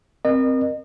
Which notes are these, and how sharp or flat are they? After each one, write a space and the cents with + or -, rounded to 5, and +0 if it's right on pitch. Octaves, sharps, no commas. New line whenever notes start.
C4 +0 A#4 +15 D#5 -35